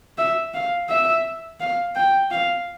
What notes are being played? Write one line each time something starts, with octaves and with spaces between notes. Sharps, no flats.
E5
F5
E5
F5
G5
F5